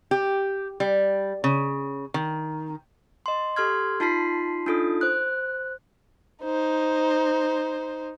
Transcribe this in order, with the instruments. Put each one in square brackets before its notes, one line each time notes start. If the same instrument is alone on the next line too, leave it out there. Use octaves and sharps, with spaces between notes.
[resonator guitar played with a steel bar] G4
G3
C#3
D#3
[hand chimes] D#5 C6
G4 A4 C6 F6 G#6
D#4 F4 A5 C6 B6 C7
D4 D#4 F4 A4 D#6
C5 F#6
[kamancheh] D#4 C5